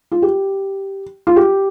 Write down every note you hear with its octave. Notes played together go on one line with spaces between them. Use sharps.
F4
G4
F4
G4